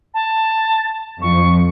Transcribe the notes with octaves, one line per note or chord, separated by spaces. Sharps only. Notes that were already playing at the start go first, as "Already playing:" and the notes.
A5
F2 C#6